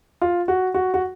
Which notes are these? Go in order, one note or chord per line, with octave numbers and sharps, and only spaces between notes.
F4
F#4
F#4
F#4